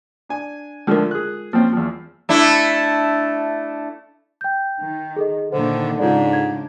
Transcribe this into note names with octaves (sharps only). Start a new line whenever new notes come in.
D4 G#5
D3 F3 G#3 A3 F4 A#4
G#4 F#6
F3 A#3 C4 C#4
E2 F3
A3 D4 E4
G5 G6
D#3
G#4 A4 D#5
A#2 D3 D#3 D4 C5
G#2 C#3 G#3 D4 F4 A4 D5
G#6